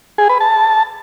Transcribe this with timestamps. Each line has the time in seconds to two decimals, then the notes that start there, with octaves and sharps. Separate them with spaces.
0.18 G#4
0.29 B4
0.40 A5